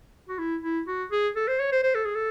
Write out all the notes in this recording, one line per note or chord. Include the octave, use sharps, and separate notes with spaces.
F#4
E4
E4
F#4
G#4
A4
C5
C#5
C5
C5
A4
G#4
A4